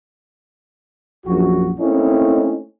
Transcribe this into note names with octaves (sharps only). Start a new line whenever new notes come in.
A#1 F#2 F#4
A3 A#3 C4 C#4 D#4 E4